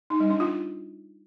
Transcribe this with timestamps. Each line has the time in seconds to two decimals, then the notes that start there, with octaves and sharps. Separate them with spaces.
0.10 D#4
0.20 G3
0.30 D4
0.40 F4